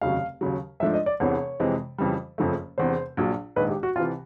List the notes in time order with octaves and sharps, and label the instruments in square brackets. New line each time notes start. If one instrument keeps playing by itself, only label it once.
[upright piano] F1 D#2 C#3 F#3 [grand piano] F5
[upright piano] D#2 C#3 F#3
[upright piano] G#2 F3 A3 D4 [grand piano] E5
[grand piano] D#5
D5
[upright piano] E1 E2 C3 E3 [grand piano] C#5
[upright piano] F2 C3 E3 G#3
F2 C#3 E3 G3
F#1 F2 C#3 F3 A3
[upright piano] E1 E2 C3 E3 [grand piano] C5
[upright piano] A#1 A#2 F#3
[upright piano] A#1 G#2 D#3 G#3 [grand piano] B4
[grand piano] G4
F#4
[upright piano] C2 C3 E3 [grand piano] F4